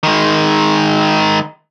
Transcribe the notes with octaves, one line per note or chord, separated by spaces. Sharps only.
D#3 G#3